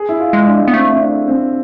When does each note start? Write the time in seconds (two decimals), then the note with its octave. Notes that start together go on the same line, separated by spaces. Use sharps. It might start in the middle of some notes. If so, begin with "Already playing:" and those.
Already playing: G#4
0.09 E4
0.20 F4
0.33 G#3
0.47 D4
0.68 B3
0.74 A3 C4
0.91 C4
1.01 D4
1.28 C4